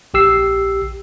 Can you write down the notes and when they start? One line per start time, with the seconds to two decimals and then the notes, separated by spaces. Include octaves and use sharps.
0.14 A#1 G4 E6 C7